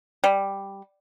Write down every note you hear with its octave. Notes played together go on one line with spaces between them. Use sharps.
G3